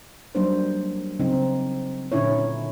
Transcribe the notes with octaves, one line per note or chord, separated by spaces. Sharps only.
F#3 G3 A#3 D4 D#4 C5
C#3 F#3 C4 D#4
A#2 D3 C#4 D#4 E4 C#5